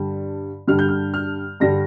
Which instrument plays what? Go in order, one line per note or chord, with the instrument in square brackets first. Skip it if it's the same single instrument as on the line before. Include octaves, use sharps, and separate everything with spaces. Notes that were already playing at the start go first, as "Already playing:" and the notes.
Already playing: [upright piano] G2 D3 G3
G2 D3 G3 F6
G6
F6
F6
G2 D3 G3 A#6